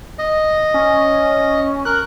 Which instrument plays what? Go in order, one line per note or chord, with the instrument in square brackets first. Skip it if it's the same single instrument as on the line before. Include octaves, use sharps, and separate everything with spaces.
[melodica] D#5
[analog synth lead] C#4
[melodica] A#4 [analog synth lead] F#6